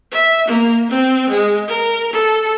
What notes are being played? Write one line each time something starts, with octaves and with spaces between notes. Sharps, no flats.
E5
A#3
C4
G#3
A#4
A4